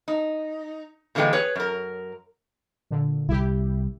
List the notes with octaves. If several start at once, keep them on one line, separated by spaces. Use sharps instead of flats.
D#4
A#2 D3 E3 G#3 A#3 G5
G#4 B4 C#5
F#2 A#4
A#2 D3
C2 E4 G4